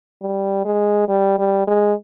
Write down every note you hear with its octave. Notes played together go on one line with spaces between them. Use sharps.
G3
G#3
G3
G3
G#3